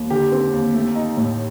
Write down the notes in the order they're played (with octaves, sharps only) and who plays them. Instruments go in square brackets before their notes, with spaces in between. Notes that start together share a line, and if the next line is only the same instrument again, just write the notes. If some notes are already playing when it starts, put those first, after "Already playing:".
Already playing: [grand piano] D#2
D3 G4
C4
D#2
A3
D#4
A2